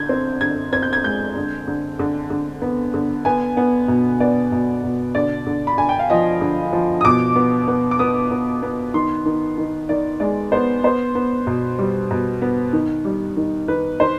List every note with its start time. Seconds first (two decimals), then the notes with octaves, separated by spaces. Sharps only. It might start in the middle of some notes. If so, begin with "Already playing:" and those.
Already playing: D3 G6 G#6
0.09 C4
0.41 D3 G#6
0.73 C4 G#6
0.83 G6
0.93 G#6
1.04 G#3 G6
1.36 D3
1.68 D3
1.99 D3
2.30 D3
2.62 B3
2.94 D3
3.25 B3 G#5
3.57 B3
3.88 B2
4.20 B3 D5
4.52 B2
4.84 B2
5.15 D3 D5
5.47 D3
5.67 B5
5.78 D3 G#5
5.89 G5
5.99 F5
6.10 F3 D#5
6.41 D3
6.73 F3
7.01 D#6
7.04 B2 D6
7.36 B3
7.68 B3
7.91 D6
7.99 B3 D#6
8.31 B3
8.63 B3
8.94 D#3 C6
9.26 D#3
9.58 D#3
9.89 D#3 D5
10.20 G#3 D5
10.52 B3 C5
10.84 B3 C5
11.15 B3
11.47 B2
11.79 G3
12.11 B2
12.42 B3
12.73 D#3
13.05 G3
13.37 D#3
13.68 D#3 B4
14.00 D#3 C5